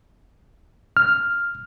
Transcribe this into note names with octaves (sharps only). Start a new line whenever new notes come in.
F6